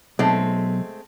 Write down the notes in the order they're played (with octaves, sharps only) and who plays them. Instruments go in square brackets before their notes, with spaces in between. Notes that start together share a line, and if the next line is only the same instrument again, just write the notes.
[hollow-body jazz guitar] B1 [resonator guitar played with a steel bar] G#3 A3 C4